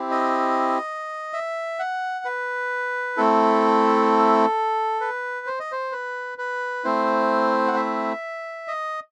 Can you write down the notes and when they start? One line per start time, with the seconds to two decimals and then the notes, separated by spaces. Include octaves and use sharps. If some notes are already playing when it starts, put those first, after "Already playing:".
Already playing: C4 E4 G4
0.11 D#5
1.33 E5
1.79 F#5
2.25 B4
3.17 A3 C4 E4 A4
5.01 B4
5.47 C5
5.60 D#5
5.72 C5
5.92 B4
6.38 B4
6.84 A3 C4 E4 C5
7.68 F#5
7.76 E5
8.68 D#5